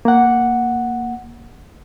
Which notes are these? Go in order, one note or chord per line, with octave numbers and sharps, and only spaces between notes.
A#3 F#5